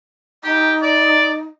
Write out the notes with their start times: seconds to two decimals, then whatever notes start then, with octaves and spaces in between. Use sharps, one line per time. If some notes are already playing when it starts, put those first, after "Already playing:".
0.44 D#4 G4
0.82 D5